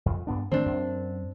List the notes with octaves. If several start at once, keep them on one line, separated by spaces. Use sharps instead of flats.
F2
G2 B3 D4
D#3 E3 A3 C4 D4
F#2